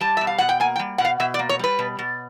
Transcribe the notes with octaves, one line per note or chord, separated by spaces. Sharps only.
G3 A5
B2 E5
F5
B2 F#5
G5
A#3 G#5
G5
G3
B2 F#5
F5
B2 E5
D5
A#3
C#5
G3 B4
B2
B2